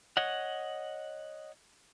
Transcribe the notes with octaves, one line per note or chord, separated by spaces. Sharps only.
C#5 D#5 F#5